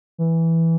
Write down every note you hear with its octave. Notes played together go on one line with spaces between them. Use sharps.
E3